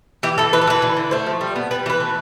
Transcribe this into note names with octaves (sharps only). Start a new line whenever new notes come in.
E3 G4
E3 A4
E3 B4
A4
E3 B4
D3
D3
A3 C5
F3
G3
B3
G3 B4
E3 B4
A3